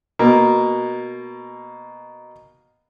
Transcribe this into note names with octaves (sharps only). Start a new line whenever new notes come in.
B2 A#3